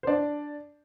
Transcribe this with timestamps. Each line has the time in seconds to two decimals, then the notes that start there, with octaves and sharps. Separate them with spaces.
0.03 C5
0.07 D4 D5